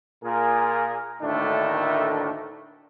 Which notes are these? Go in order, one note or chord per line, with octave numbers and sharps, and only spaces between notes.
A#2 G#4 A#4
D2 A2 D#3 A3 A#3 D4